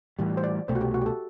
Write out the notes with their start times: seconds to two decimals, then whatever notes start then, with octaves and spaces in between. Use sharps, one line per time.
0.19 A2 E3 G3
0.37 C5
0.44 D5
0.68 C2 B2 A3 C5
0.75 F#4
0.81 G4
0.94 F#4
1.01 G4
1.06 A4